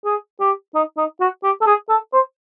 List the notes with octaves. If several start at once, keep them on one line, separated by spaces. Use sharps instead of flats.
G#4
G4
D#4
D#4
F#4
G4
A4
G#4
A4
C5